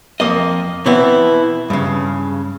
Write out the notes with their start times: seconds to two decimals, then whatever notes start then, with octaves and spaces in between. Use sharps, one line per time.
0.20 F2 A#3 D#5
0.86 B2 E3 B3 C4 E4
1.70 G2 C#3